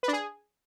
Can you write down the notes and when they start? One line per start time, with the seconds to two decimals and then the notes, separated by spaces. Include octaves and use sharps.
0.03 B4
0.08 D4
0.13 G#4